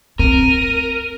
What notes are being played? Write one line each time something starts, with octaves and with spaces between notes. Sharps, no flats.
C4 A#4 D#7